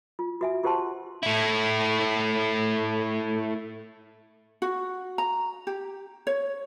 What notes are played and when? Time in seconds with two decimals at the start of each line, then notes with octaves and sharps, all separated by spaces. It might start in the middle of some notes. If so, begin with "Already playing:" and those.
0.19 F4
0.41 F#4 E5 G#5
0.64 F4 G4 C5 F#5 A5 C6
1.23 A3 E4
4.62 F#4
5.18 A#5
5.67 G4
6.27 C#5